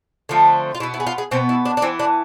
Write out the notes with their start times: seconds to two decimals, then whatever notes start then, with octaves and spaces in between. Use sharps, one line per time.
0.29 D3 F3 A3 C4
0.75 F4
0.80 B2 E4
0.83 B3
0.94 E4
1.00 G#4
1.07 F4
1.18 G#4
1.31 B2 B3 C4
1.49 E4
1.65 D4
1.77 D4
1.82 E3 B3 C4
1.99 D4